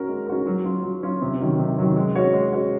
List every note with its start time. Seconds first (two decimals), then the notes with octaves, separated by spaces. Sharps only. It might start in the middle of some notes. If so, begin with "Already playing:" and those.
Already playing: C#4 F#4 A#4
0.08 G#3
0.27 C#4 F#4 A#4
0.46 F#3
0.65 C#4 F4
0.83 F#3
1.03 C#4 F4
1.22 C3
1.40 D#3 F#3 C#4
1.59 C3
1.78 D#3 F#3 C#4
1.96 G#3
2.15 C#4 F#4 C#5
2.33 G#3
2.52 C#4 F#4 C#5